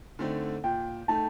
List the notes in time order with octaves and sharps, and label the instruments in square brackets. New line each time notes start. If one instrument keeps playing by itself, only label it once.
[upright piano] D3 A3 C4 D#4
[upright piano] A#2 [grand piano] G5
[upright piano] A3 D#4 [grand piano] A5